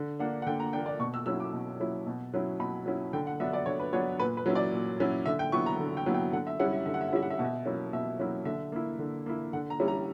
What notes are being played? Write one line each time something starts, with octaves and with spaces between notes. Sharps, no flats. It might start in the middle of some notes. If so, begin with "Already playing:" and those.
Already playing: D3
A#3 D4 F#5
F#5
D3 G5
A#5
A#3 D4 G5
D5
B2 C#6
E6
F#3 C#4 E4 E6
D6
B2
F#3 C#4 E4
B2
F#3 C#4 E4
B2 B5
F#3 C#4 E4
D3 G5
F#5
F#3 B3 D4 E5
D5
D3 C#5
B4
F#3 B3 D4 C#5
A#2 B4
B4
F#3 C#4 E4
D5
A#2
F#3 C#4 E4
D3 E5
G5
F#3 B3 E4 C#6
A#5
D3
G5
F#3 B3 E4
G5
D3 F#5
E5
G3 C#4 E4 F#5
E5
D3 E5
F#5
E5
F#5
G3 C#4 E4 E5
F#5
E5
B2 F#5
E5
F#3 A#3 C#4 E4
B2 E5
F#3 A#3 C#4 E4
D3 E5
A#3 E4
D3
A#3 E4
D3 F#5
A#5
G3 C#4 E4
A#5